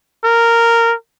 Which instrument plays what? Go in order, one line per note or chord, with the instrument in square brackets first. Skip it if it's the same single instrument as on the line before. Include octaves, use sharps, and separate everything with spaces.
[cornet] A#4